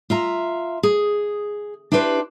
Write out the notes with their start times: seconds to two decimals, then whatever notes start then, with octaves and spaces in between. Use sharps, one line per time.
0.10 F4 E5 A#5
0.83 G#4
1.92 D4 E4 G4 B4 C5